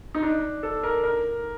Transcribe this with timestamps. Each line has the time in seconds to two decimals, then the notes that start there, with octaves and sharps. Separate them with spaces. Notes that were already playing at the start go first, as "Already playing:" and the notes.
0.15 D#4
0.23 D4
0.63 A4
0.83 A#4
1.04 A#4